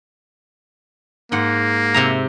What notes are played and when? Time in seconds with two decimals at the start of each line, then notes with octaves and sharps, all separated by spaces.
1.32 G#2 A#3 F#5
1.94 C3 E5 A#5